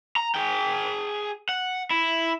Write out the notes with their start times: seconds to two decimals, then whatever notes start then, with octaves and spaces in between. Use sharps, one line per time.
0.16 A#5
0.35 G#4 G5
1.49 F#5
1.91 E4